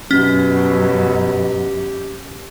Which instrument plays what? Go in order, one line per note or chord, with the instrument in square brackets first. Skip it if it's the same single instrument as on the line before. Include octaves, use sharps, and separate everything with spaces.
[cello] F#2 [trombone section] B2 F#3 [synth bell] C#4 [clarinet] G4